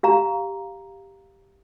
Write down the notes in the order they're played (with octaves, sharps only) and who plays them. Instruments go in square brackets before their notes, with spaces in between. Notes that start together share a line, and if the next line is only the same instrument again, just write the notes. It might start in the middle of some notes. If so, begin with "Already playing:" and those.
[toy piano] G4 F5 A#5